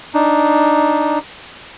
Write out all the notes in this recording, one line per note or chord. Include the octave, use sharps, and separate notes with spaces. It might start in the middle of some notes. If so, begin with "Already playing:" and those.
D4 D#4